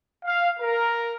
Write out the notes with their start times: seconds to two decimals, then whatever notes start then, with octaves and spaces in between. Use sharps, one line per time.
0.25 F5
0.59 A#4